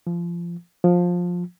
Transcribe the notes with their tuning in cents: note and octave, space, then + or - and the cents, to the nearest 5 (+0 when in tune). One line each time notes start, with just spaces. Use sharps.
F3 -25
F3 +15